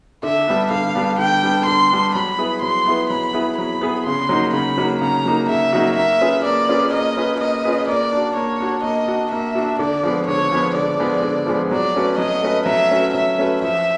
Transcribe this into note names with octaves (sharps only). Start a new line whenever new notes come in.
D3 E5
G3 B3 D4
D3 F5
G3 B3 D4
D3 G5
G3 B3 D4
D3 C6
G3 B3 D4
F#3 B5
B3 E4 G#4 B4
F#3 C6
B3 E4 G#4 B4
F#3 B5
B3 E4 G#4 B4
F#3 B5
B3 E4 G#4 B4
C#3 C6
F#3 A#3 D#4 F#4
C#3 B5
F#3 A#3 D#4 F#4
C#3 A#5
F#3 A#3 D#4 F#4
C#3 E5
F#3 A#3 D#4 F#4
A#3 E5
C#4 F4 G#4 B4
A#3 D5
C#4 F4 G#4 B4
A#3 D#5
C#4 F4 G#4 B4
A#3 D#5
C#4 F4 G#4 B4
A#3 D5
D4 F#4
A#3 C#5
D4 F#4
A#3 D#5
D4 F#4
A#3 E5
D4 F#4
D3 D5
F3 G#3 B3
D3 C#5
F3 G#3 B3
D3 D5
F3 G#3 B3
D3
F3 G#3 B3
F#3 D5
A3 C#4 F#4 B4
F#3 D#5
A3 C#4 F#4 B4
F#3 E5
A3 C#4 F#4 B4
F#3 E5
A3 C#4 F#4 B4
F3 E5